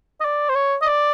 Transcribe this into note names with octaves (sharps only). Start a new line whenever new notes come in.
D#5
D5
C5
C#5
D#5
D5